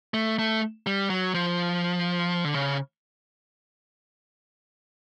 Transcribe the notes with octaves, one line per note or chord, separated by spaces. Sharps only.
A3
A3
G3
F#3
F3
D3
C#3